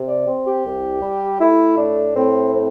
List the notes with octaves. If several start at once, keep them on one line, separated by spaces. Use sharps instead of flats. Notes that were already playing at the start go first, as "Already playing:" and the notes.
Already playing: C3
D5
C4
G4
C2
G3
A3 E4
A2 D4
A2 C4
C4